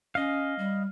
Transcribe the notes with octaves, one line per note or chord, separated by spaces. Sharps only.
C#4 D#5 F5
G3